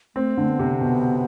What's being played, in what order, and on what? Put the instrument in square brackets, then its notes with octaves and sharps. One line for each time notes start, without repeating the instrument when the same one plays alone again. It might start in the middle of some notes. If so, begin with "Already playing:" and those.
[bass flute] A3 [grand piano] C4
[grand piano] D3 [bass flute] A3
[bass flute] B3
[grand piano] C3
[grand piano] B2 [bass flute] B3